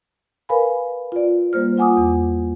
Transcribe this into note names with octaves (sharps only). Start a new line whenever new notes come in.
A#4 B4 D5 F5 G#5 B5
F4 D5
G3 A#3 C5 F6
F4 F#5 G#5 D6 D#6
E2